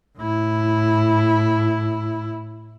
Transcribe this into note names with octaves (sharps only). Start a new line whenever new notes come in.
A2 E4